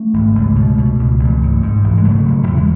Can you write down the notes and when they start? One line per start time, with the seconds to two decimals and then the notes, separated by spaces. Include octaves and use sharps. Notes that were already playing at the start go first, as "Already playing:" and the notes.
Already playing: A3 C#4
0.14 G#1
0.35 C#2
0.56 B2
0.78 B2
0.99 C#2
1.19 A1
1.42 G#2
1.62 G#2
1.84 A1
1.97 G#3
2.04 C#3 F#3 A3
2.26 F#1
2.47 E2 A3
2.57 G#3